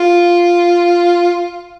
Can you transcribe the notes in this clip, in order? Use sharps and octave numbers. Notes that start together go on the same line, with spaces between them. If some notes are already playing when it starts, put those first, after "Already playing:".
Already playing: F4